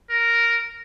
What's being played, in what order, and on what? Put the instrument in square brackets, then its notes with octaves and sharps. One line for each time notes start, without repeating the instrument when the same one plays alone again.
[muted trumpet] A#4